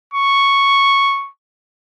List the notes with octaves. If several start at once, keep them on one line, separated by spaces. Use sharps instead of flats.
C#6